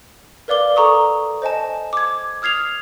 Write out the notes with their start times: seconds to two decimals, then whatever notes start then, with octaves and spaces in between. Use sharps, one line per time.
0.48 A#4 B4 D5 F5 D6 G7
0.76 A4 A#5 C#6 D#6
1.42 C5 D#5 G#5 A5
1.93 D6 G#6
2.42 D#6 F6 G#6 C7 F7